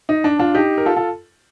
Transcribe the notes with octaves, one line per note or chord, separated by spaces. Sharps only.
D#4
D4
D4 F4
D#4 G4
A#4
F4 A4
F4 A4